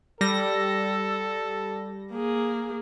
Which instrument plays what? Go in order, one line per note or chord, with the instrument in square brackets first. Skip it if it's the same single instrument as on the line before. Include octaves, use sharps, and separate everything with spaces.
[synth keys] G3 A#6 [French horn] A4
[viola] A#3 G#4